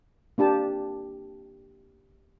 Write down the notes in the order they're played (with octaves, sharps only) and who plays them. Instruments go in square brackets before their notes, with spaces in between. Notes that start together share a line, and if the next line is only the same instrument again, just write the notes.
[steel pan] A#3 D4 G4 A5